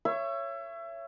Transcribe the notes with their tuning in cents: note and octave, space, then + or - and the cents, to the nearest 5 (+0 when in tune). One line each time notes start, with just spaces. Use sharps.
C#5 +0 E5 +30